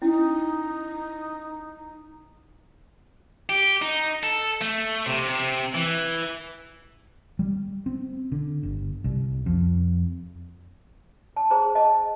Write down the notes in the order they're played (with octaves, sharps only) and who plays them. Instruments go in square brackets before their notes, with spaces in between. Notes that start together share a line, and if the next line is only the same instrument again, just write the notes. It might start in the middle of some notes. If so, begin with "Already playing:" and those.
[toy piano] C#4 E4 [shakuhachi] D#4
[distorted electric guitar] G4
D#4
A4
A3
C3
C3
E3
[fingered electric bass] G3
C4
D3
G1
C2
F2
[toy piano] A5
G#4 C5 A5 A#5
D#5 A5